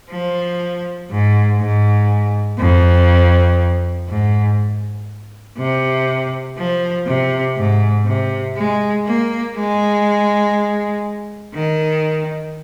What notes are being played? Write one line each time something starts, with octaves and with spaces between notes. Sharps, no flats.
F3
G#2
G#2
F2
G#2
C3
F3
C3
G#2
C3
G#3
A#3
G#3
D#3